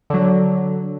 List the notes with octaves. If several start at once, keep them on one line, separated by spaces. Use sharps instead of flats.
D3 F#3